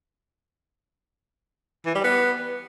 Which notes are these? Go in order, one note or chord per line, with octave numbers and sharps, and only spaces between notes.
E3
G3
B3